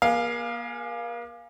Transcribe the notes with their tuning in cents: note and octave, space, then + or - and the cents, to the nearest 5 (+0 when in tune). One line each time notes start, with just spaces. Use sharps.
A#3 +40 G#4 +0 F5 +0